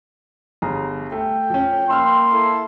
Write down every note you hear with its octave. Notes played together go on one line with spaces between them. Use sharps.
G1 G#4 A#5
A3 G5
F3 C#4
A#3 B5 C6 E6 F6
E4 A4